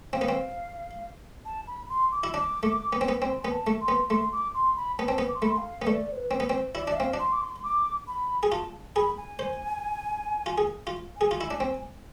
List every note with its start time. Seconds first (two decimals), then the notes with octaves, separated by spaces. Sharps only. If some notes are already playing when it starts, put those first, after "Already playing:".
0.13 C4 F5
0.21 B3
0.29 C4
1.45 A5
1.67 B5
1.90 C6
2.12 D6
2.24 E4
2.34 D4 D6
2.63 A3
2.93 B3
3.01 C4
3.08 B3
3.22 C4 C6
3.42 B3 G#5
3.52 A5
3.67 A3
3.81 C6
3.88 B3
4.10 A3 C6
4.32 D6
4.54 C6
4.77 B5
4.98 B3 A5
5.08 C4
5.18 B3
5.28 D6
5.35 C6
5.42 A3 B5
5.50 C6
5.58 F5
5.82 B3
5.87 A3 D5
6.12 C5
6.16 B4
6.31 C4
6.40 B3
6.46 C4 C5
6.75 E4 D5
6.88 D4 E5
6.97 C4 F5
7.14 D4
7.19 C6
7.32 D6
7.41 C6
7.63 D6
8.07 B5
8.43 G#4
8.52 F4 A5
8.96 G#4 B5
9.17 G#5
9.39 C5
10.46 F4
10.58 G#4
10.87 F4
11.16 G#4 G#5
11.31 F4
11.41 E4
11.51 D4
11.60 C4